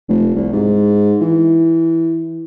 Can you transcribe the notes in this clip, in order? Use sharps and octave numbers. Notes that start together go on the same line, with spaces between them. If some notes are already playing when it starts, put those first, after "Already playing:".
F1
C2
G#2
E3